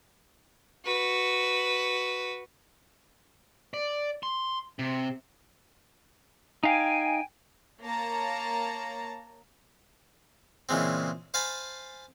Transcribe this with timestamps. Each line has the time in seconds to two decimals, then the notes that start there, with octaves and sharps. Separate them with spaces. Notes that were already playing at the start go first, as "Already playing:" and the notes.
0.85 F#4 B4
3.74 D5
4.23 C6
4.79 C3
6.63 D#4 F5 G5 G#5
7.83 A#3 C#5 A5 A#5
10.69 A#2 C#3 E3 G#3 C4
11.34 C5 F5 G#5 A5 B5